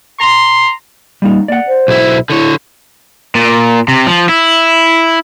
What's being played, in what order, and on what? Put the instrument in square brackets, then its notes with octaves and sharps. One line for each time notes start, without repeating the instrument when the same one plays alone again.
[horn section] A#5 C6
[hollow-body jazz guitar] G3 A#3 D#4
[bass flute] A#3 [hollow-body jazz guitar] D5 F#5
[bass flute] C5
[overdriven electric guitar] B1 E4
[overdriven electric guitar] D3 C#5 [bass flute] E4
[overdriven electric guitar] A#2
C3
F3
E4